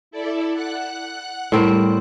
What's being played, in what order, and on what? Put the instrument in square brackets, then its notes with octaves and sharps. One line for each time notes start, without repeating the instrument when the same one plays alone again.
[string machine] E4 A4 D5
F#5 F#6
[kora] A2 C4 A#4 [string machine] G3